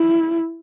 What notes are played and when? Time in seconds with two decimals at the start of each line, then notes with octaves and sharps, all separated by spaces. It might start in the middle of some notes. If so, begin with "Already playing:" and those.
Already playing: E4